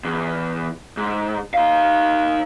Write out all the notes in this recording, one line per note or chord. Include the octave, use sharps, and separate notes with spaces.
E2
G#2
D#4 F5